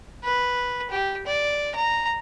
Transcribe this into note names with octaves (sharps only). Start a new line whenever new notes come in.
B4
G4
D5
A#5